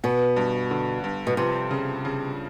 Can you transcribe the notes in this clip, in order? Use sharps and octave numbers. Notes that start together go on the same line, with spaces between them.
B2 B3
G2
D3
G2
B2
C3 F3
C#3
C#3